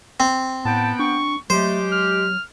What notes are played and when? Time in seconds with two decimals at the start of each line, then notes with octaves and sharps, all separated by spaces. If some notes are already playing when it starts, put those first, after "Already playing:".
0.20 C4
0.65 A2 B3 F#5 G5 A5
0.99 D4 C#6
1.50 F#3 G#3 A3 G4 C5
1.92 F6